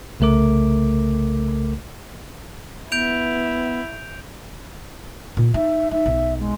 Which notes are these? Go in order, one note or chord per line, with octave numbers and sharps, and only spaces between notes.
C2 C#3 A3 A#4 D6
B3 E4 G6 D7 F7
A#2
D#4 E5
D#4 E5
B1
G#3